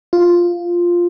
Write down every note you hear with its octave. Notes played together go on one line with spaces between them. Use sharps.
F4